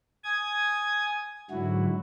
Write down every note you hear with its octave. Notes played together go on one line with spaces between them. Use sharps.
G#5 D#6 G#6
G#2 D3 F#3 E4 F#4